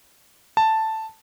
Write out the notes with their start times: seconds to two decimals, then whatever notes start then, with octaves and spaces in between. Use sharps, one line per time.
0.57 A5